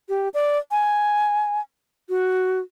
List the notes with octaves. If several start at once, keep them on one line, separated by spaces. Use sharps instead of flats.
G4
D5
G#5
F#4